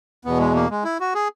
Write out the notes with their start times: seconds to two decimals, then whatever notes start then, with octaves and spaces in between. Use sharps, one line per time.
0.25 E2 B2 B3
0.39 G#3
0.55 A#3
0.70 G#3
0.84 E4
1.00 F#4
1.15 G#4